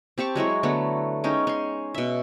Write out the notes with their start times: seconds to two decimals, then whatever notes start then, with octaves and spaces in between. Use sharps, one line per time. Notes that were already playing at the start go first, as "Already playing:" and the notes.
0.18 C4 G4 A5 C#6
0.35 F#3 G#3 E4 C#5
0.63 D3 F#3 A3 B3
1.24 G#3 C#4 D#4 G5
1.47 C#4 C6
1.95 B2 E5